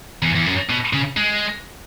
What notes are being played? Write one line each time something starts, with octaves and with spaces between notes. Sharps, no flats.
E2
E2
F#2
B2
C#3
G#3